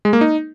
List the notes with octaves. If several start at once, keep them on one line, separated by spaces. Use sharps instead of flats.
G#3
A#3
D#4